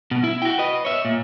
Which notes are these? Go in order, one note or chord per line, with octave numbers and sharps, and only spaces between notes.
B2
E4
F#4 G5
B4 D#5
C#5 E5
A#2